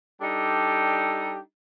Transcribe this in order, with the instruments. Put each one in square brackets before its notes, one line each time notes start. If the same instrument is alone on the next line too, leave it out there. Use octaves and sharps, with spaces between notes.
[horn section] G3 D4 D#4 G4 A4